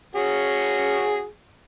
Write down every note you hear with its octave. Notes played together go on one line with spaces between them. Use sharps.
C#4 F#4 G#4